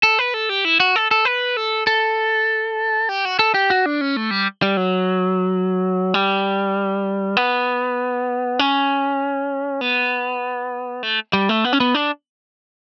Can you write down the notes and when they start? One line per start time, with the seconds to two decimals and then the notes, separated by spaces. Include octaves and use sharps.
0.03 A4
0.19 B4
0.34 A4
0.49 G4
0.65 E4
0.80 F#4
0.96 A4
1.11 A4
1.25 B4
1.57 A4
1.87 A4
3.09 G4
3.25 F#4
3.39 A4
3.54 G4
3.70 F#4
3.86 D4
4.01 C#4
4.16 A3
4.31 G3
4.62 G3
4.77 F#3
6.14 G3
7.37 B3
8.59 C#4
9.81 B3
11.03 A3
11.33 G3
11.49 A3
11.64 B3
11.73 C#4
11.80 B3
11.94 D4